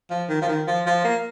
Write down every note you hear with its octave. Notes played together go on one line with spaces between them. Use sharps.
F3
D#3
F3
D#3
F3
F3
A#3